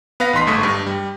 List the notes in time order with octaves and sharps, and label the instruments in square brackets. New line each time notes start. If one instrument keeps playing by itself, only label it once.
[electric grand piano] B3 B4 F5 A#6
A1 D#4 C6 B6
G1 G#2 A3 C#6 D#6
G2
G3